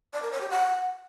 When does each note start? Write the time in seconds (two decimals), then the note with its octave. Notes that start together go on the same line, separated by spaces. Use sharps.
0.13 D5
0.22 A#4
0.31 C#5
0.41 G4
0.50 F#5